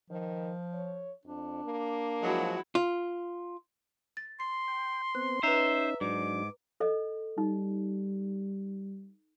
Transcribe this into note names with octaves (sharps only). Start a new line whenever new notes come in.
D#3 F3
C#5
F2 D4
A#3
F3 F#3 G#3 E4 F#4
F4
A6
C6 C7
G5
B3 C4 C5 F#6
C#4 D#4 B4 C5 E5 A#5
G#2 F#3 D4 D6
A4 D#5
G3 D#4